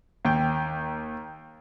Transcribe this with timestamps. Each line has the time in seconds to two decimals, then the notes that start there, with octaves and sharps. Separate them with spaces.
0.25 D#2 G5